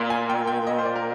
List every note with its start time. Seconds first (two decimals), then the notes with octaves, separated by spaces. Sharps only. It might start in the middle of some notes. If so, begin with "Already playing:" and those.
Already playing: A#2 C6
0.10 G#5
0.30 G5
0.47 G5
0.67 D#5
0.78 C5
0.85 D5
0.96 A#4